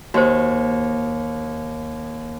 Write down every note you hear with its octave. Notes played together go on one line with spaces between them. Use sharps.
D#2 F#4 G4 C5